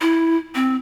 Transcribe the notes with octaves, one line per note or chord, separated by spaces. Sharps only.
E4
C4